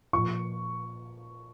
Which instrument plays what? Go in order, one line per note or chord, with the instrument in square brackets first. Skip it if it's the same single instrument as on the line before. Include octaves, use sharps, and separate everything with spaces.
[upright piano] A#2 F3 C#6